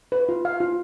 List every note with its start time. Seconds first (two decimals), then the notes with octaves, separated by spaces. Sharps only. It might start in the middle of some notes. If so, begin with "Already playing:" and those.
0.12 B4
0.29 F4
0.45 F5
0.60 F4